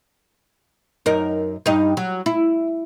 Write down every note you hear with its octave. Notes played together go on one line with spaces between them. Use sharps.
F#2 D#4 A#4
G2 D#4
F#3
E4